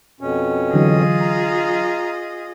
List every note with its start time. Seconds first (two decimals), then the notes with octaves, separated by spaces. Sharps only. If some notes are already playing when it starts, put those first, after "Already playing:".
0.21 F2 B2 C#4
0.74 D3 E3 F#3 F4 G#4 D#5
1.20 A#5